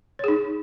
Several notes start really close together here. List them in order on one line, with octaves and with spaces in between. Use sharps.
C#5 G#4 D#4